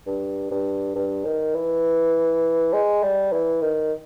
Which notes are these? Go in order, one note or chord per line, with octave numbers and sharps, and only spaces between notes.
G2
G2
G2
D#3
E3
G#3
G3
E3
D#3